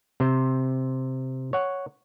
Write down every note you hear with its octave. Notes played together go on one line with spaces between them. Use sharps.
C3 C5
C#5 F#5